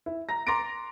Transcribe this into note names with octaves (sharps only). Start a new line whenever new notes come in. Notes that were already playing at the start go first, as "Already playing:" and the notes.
E4
A#5 A#6
A#5 C6 D6 A6 A#6 D7